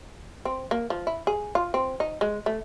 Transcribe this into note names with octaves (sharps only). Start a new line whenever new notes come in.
C4
A#3
F3
E4
G#4
F4
C4
D#4
G#3
A3